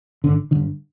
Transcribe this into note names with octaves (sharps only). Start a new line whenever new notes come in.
G#1 D3
G2 D3 D#3